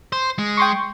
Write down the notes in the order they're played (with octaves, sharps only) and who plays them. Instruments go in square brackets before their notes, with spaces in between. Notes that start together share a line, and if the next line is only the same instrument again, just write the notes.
[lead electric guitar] C5
G#3
[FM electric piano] G5 C6 C#6